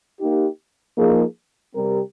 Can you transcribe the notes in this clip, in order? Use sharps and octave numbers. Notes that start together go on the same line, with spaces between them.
A#3 D#4 G4
F3 A#3 D#4 G#4
C3 G3 C4 G4 A#4